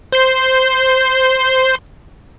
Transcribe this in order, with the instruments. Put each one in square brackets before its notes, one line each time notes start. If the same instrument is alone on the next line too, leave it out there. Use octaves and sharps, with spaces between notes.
[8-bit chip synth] C5 G6 C7